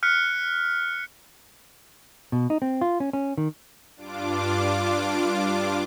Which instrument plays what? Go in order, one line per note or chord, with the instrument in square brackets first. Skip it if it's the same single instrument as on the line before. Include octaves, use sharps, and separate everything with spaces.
[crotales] F6 F#6 B6 C#7
[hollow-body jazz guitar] B2
D#4
C4
F4
C#4
C#4
D#3
[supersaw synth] G2 D4 F4 D6